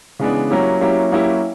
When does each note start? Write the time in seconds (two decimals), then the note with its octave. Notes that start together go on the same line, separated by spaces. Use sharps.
0.19 C#3 E3 G#3 B3 D4
0.50 F#3 A#3 C#4 E4 G4
0.81 F#3 A#3 C#4 E4 G4
1.12 F#3 A#3 C#4 E4 G4